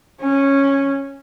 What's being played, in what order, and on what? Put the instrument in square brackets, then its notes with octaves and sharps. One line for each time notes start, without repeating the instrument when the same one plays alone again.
[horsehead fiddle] C#4